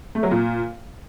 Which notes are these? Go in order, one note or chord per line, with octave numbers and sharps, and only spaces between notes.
A3
F#3
A#2